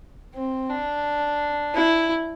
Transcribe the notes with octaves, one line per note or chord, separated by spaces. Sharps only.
C4
D4
E4